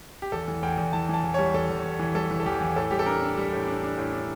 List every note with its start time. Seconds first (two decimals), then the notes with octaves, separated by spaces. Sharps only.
0.22 G4
0.32 E2 A4
0.48 E3
0.63 E2 G5
0.78 E2
0.93 E3 A5
1.09 E3 A5
1.24 E2
1.34 C#5
1.39 G3
1.54 E2 A4
1.69 E2
1.84 E2
1.99 E3
2.15 G3 A4
2.31 E3
2.40 A4
2.46 E2 G4
2.61 E3
2.76 A2 A4
2.91 G3 G4
2.99 A4
3.06 D4 A#4
3.21 D4
3.37 G3
3.52 A2
3.67 D4
3.83 D4
3.98 A2
4.13 D4